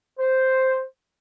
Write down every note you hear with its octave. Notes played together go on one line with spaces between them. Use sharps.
C5